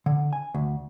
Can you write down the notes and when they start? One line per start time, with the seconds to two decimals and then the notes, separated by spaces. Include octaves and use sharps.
0.06 D3
0.33 G#5
0.54 D2